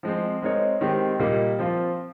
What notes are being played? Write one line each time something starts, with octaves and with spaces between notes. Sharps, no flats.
F3 G#3 C4
G#3 C4 D#4 A#4 C#5
D#3 G#3 C4 G4
A#2 G3 A#3 D#4
F3 C4 F4